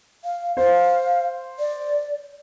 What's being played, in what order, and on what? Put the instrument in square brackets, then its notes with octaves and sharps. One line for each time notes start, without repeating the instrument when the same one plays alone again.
[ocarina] F5
[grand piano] C5 [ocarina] F5
[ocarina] D5